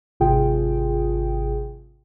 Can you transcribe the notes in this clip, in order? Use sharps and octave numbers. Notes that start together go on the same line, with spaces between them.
G#1 C3 F4 G#4 G5